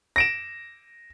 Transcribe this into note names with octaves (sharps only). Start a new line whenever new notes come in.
A#6 D7 E7